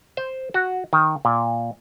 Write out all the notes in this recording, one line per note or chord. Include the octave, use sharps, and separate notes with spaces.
C5
F#4
D#3
A#2